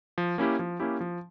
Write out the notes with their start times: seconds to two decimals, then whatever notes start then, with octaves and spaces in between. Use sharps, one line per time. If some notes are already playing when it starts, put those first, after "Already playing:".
0.18 F3
0.38 A#3 C#4 E4 G4
0.59 F3
0.80 A#3 C#4 E4 G4
1.00 F3